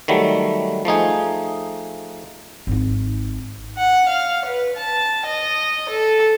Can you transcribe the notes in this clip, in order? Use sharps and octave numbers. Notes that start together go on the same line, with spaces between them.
D#3 F#3 G3 A3
F3 A3 D#4 G#4
G#1 D#4
F#5
F5
B4
A5
D#5
A4